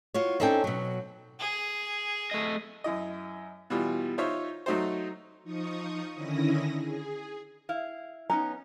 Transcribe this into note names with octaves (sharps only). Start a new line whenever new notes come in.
F4 F#4 C#5
C4 C#4 D#4 A4 D5 G5
B2 F#3
G#4
A3 D#5
F#2 E4 D#5
B2 E3 G3 F4
D#4 F4 C5 C#5 E5
F#3 A3 D#4 F#4 C5
F3 D#4 C#6 D#6
D3 D#3 C#4 E4 D#6 A#6
G#4
E4 F5
B3 C#4 D#4 A#5